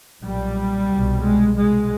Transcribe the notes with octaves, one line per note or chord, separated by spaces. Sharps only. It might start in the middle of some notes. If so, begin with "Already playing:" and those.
B1 A#2 G3
C2 B2
G#3
C2 B2 G#3